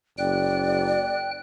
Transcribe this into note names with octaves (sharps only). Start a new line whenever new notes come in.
F#1 D5 G5 F#6